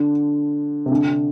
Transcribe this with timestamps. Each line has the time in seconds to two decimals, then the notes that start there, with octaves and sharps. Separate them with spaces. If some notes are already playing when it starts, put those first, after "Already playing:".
Already playing: D3
0.86 C3
0.91 D3